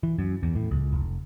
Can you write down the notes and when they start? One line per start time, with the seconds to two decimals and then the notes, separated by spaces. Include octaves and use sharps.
0.03 E3
0.18 F#2
0.43 E2
0.55 A2
0.71 C#2
0.93 F1